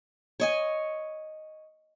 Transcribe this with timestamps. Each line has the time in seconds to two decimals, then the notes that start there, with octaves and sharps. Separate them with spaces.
0.40 C#5 D#5 G#5